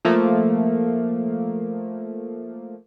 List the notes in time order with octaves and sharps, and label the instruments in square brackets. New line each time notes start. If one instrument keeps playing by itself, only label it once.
[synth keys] F3 A3 A#3